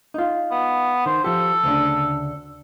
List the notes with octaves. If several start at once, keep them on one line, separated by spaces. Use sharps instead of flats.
D#4 F4
B3
D#3 C5
F3 G4 A4
D2 C#3 D4